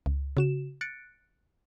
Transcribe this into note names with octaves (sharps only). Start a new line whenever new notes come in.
C#2
C#3 F#4 E7
F#6 A6 C#7 D7